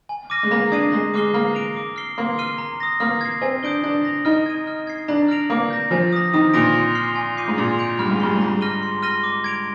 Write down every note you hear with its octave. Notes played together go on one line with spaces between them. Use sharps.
G#5
D6 F6 A#6 D#7
G#3
A#3 A#5
D4 D#6 G#6 C7 D#7
G#3 A#5
G#3 D6 F6 C7 G7
A#3 F6
A#6 D7 F7
D6
F6 C7 G7
A#3 C6
F6 C7 D#7 G7
A#5
D#6 A#6
A#3 F6
G#6 C7
C4 G#5
D4 D#6 G6 D7 G7
D4 G6
A#6 F7
D#4 F6
G#6 D#7
F6
G#6 C7
D4 A#5
F6 A#6 D7 F7
A#3 D6
G6 A#6
F3 G#5
D#6 A#6
D#3 D#6
A#2 A#6 D7 F7
C6
F6 C7 G7
G#5
D6 G6 C7 D#7
G#2
A#2 C6
G6 D7 F7
G2 F6
G#2
G2 C7 G7
G#2
A#5
G2
F6 A#6 D#7 G7
C6
F6 A#6 D#7 G7
D6
G#6 D7 F7